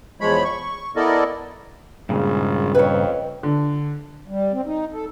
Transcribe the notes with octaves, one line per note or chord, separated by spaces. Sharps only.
E2 F3 G#3 C#5 B5
C#6
B3 E4 A4 A#4 D5 D#5
G#1 G2 A#2 C#3 G#3
F2 B4 C#5 D#5 G5
D3
G3
C4
D#4
A4